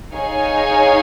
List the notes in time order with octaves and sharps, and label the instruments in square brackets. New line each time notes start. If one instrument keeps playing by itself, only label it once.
[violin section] D#4 G#4 C#5 F5 G#5